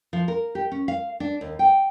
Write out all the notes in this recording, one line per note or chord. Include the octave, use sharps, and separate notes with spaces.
F3
A#4
G4
C#4
F5
D4
D#2
G5